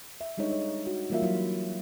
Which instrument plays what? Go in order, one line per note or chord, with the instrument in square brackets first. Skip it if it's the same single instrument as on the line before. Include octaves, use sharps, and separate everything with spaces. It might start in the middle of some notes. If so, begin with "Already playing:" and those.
[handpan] E5
G3 G#3 D4 D#4 C#5
C#5
F#4
E3 G3 A#3 F4 A#4 E5
F#3 E4